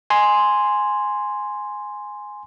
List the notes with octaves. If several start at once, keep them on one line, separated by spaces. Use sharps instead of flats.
G#5 C6